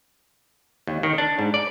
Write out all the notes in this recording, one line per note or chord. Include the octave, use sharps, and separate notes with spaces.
D#2
D#3
D4
G#2
D5